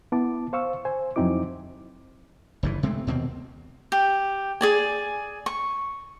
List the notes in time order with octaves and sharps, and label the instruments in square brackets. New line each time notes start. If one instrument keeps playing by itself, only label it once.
[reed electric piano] B3 E4 A5 D6
C5 F5 C#6 E6
C5 G#5
F2 F#3 C4 D#4 E4 D6
[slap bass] F#1 G2 E3
C3 G#3 A3 C4
D#2 B2 G3 C4
[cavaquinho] G4
G#4 D5 G#5
C#6